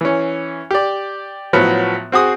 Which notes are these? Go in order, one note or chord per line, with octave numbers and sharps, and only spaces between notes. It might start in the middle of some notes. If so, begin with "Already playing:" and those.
E3 C#4
G4 D5
A2 F3 F#3 B3
C4 F#4 G#4 D#6